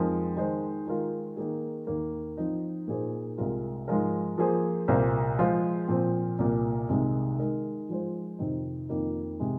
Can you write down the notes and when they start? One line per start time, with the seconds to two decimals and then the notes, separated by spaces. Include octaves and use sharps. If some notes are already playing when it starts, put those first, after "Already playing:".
Already playing: F2 F3 G#3 D#4 A#4
0.36 D#3 G#3 D#4 C5
0.87 D#3 G#3 F4 A#4
1.37 D#3 A#3 G#4
1.87 D#2 D#3 A#3
2.37 F3 C4 D#4
2.88 A#2 A#3 D#4 G#4 C5
3.38 C2 C3 G#3 F4 A#4
3.88 G#2 F3 G#3 F4 A#4
4.38 F3 A#3 G#4 C5
4.88 C2 A#2 A#3 F4 C5
5.38 F3 G#3 F4 G#4 C5
5.88 A#2 F3 C4
6.39 C2 A#2 A#3
6.89 C2 C3 D#3 G#3 D#4
7.39 D#3 G#3 D#4 A#4
7.89 F3 G#3 F4 C5
8.39 F2 C3 D#3 C4 D#4
8.89 F2 D#3 A#3 D#4
9.40 C3 G#3